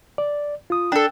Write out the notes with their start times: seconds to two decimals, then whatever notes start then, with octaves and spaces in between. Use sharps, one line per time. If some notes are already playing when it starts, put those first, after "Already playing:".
0.18 D5
0.70 F4 D#6
0.92 D4 A4 G5